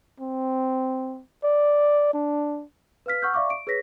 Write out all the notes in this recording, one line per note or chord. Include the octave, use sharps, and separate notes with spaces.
C4
D5
D4
B4 F5 F6 B6
F#5 C#6 E6 F6 G6
D5 E5 F5 C#6 D6
D7
G#4 B4 C#5 A#6 B6